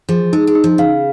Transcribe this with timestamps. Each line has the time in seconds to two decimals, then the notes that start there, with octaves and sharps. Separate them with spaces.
0.09 F3 G#4
0.33 G#3 D#4
0.47 G#3
0.55 D#4
0.64 F3
0.78 C#3 F5